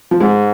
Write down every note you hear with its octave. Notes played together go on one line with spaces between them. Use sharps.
F3
G#2 G#3